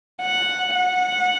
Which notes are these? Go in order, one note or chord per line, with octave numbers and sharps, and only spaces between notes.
F#5
F#5